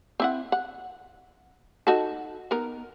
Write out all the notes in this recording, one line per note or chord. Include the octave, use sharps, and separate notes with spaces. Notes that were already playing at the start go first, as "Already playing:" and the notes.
C4 E4 F#5
F#5
D#4 F#4 A4
B3 D#4 A#4